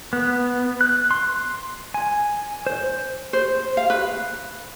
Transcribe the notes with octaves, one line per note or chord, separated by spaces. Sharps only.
B3
F#6
C6
G#5
C5
C5
F5
B4